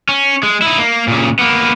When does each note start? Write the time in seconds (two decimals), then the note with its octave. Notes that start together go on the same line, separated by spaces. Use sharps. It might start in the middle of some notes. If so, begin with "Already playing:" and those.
0.09 C#4
0.43 G#3
0.62 D#4 E4
0.79 A#3
1.08 A#2 C#3
1.39 A#3 B3